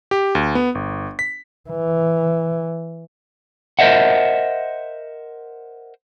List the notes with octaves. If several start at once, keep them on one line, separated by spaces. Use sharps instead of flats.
G4
D2
B3
G1
B6
E3
A#4 C5 C#5 D#5 E5 F#5